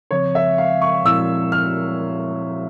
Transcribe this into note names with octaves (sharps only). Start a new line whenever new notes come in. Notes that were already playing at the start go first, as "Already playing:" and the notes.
C#3 F3 C4 C#5
E5
F5
C#6
A#2 F3 C4 E4 E6
F6